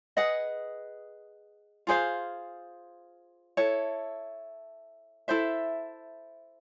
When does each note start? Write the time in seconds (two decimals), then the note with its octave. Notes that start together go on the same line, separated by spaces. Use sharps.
0.17 G#4 B4 D#5 F#5
1.87 F4 G#4 C5 F5
3.57 E4 A4 C#5
5.28 E4 A4 C5 E5